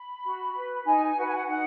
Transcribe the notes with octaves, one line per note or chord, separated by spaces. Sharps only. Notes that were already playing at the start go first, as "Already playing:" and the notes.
Already playing: B5
F#4
B4
D#4 G#5
F#4 B4 F#5
G#5
F#5
D#4 F#5